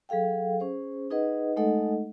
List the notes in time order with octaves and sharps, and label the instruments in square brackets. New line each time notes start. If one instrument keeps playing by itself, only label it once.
[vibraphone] F#3 G#4 A4 F5 G5
C#4 G#4 C5
D#4 G#4 B4 D#5 F#5
G#3 A3 D#4 A4 D#5 F#5